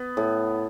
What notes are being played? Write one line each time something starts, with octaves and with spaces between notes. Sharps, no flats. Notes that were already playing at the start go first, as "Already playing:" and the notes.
Already playing: B3
A2